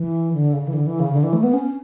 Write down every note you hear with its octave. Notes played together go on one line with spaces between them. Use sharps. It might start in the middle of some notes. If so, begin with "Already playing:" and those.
Already playing: E3
D3
C#3
E3
D3
E3
C#3
D3
E3
A3
B3
C#4